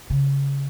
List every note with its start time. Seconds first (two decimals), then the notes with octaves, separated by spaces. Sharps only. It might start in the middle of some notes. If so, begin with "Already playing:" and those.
0.10 C#3